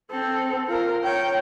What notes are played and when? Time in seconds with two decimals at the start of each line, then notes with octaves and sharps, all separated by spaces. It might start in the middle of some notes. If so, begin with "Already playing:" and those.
0.10 C4 A4
0.67 F4 A#4
1.04 C#5 G5